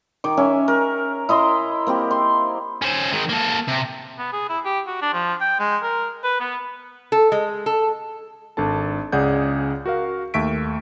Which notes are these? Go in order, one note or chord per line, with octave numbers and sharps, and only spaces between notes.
D#3 D6
C#4 E5 G#5
A#4
E4 D#5 A#5 C6
A#3 C4 G4
C6
C#4 C5
D#3 G#3
A#3 A4
C3
B3
G#4
E4
G4
F#4
D4
F3
G5
G#3
A#4
B4
B3
A4
G#3
A4
G#1 D4 A4 A5
C#2 C#3 G#4 D5 F#5 G6
F#4 A#4 F5
D#2 A3 E5 C#6 B6 D7